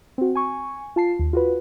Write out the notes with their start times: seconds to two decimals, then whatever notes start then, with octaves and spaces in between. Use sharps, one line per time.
0.18 C4 F#4
0.35 G#5 C#6
0.96 F4 A5 C7
1.19 D#2
1.33 F4 F#4 B4